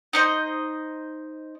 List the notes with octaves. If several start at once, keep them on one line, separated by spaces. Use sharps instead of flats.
D#4 C5 D#5